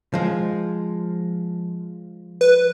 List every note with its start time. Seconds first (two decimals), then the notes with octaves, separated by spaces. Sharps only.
0.14 F3 G#3
2.41 B4